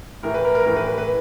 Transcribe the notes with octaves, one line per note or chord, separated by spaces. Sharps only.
A2 E3 A#4
B4
A#4
A#4
A2 E3 A#4
B4
B4
B4